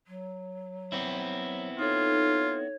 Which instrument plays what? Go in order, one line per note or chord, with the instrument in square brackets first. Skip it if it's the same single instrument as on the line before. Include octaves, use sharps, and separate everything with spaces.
[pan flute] F#3
[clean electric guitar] B3 C4 E4
[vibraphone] D#4 A4 [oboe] F4 [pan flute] C#5